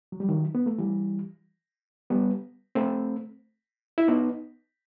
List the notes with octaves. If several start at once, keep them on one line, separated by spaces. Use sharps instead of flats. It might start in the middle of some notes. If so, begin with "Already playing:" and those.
F#3
G3
D#3 F#3
B3
A3
E3 G3
G3 B3
A3 C4
E4
B3 D#4